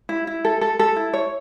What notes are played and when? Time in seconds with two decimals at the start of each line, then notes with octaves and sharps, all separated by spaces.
0.09 E4
0.27 E4
0.45 A4
0.61 A4
0.79 A4
0.96 E4
1.13 C#5